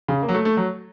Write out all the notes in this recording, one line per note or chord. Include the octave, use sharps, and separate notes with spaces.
C#3
A#3
F#3
A3
A3
F#3